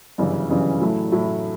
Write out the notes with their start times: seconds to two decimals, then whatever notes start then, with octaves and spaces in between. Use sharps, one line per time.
0.18 G1 F#2 C#3 E3
0.50 G1 F#2 C#3 E3
0.81 A2 F#3 A3 E4
1.12 A2 F#3 A3 E4